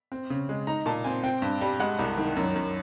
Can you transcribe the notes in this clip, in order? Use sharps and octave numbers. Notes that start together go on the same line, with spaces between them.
C4
C#3
G#3
D#4 A#5
A#2 A5
C4 G#5
C4 G5
G2
G3
G#3 F#5
C2
D#3
F#2
F#2